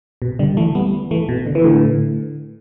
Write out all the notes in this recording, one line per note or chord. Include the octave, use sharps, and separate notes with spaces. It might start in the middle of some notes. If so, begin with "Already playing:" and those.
B2
D3 G3
E3 A3
G3 B3
E3 A3
B2
D3
E3
A2 D3